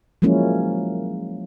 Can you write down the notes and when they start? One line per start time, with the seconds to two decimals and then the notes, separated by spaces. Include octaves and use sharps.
0.22 F3 F#3 G#3 A#3 C#4 E4